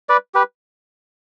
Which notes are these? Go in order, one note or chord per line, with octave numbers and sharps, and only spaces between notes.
B4 D5
G4 B4